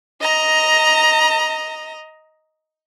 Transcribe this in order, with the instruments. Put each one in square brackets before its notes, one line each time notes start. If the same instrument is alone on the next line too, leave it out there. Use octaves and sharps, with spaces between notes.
[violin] D#5 A#5